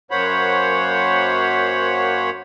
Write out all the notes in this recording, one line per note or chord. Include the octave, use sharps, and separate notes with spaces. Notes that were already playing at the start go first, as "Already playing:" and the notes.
F#2 A#3 C5 C#5 F#5 B5